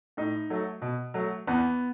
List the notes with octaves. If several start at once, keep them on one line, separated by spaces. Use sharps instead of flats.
A2 D#4
F#3 A3
B2
F#3 A3
E2 B3